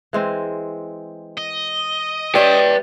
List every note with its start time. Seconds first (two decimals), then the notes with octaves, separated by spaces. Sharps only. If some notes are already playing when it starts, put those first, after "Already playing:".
0.13 E3 G#3 C4
1.38 D#5
2.35 G4 B4 C#5 D5 E5 G5